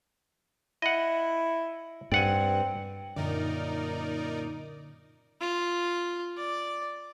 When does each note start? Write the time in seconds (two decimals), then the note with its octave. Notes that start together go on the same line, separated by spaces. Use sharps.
0.82 E4 D#5 F#5
2.12 G2 C4 D5 F#5 G#5
3.16 F#2 A#2 D3 D#4 A#4 D5
5.41 F4
6.37 D5